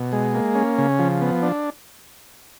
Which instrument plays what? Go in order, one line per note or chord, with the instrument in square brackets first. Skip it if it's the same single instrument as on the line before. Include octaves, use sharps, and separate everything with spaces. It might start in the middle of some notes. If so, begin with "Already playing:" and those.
Already playing: [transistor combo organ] B2
G#3
A#3
C#4
C#3
F3
B3
D4